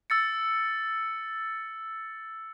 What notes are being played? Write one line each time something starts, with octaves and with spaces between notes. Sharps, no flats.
E6 A6 C#7